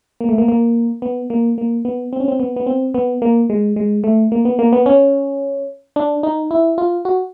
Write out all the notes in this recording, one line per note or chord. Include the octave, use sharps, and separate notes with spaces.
A#3
A3
A#3
A#3
B3
A#3
A#3
B3
C4
C#4
C4
B3
B3
C4
B3
A#3
G#3
G#3
A3
A#3
B3
A#3
B3
C#4
D4
D#4
E4
F4
F#4